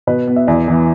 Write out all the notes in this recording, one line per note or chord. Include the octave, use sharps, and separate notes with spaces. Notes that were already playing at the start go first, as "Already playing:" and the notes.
B2 B4
B3
E5
E2 D5
E3 B3